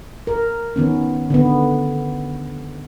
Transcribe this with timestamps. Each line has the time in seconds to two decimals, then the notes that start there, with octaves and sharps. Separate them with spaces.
0.27 A#4
0.76 D#3 B3 C#4
1.30 D3 B3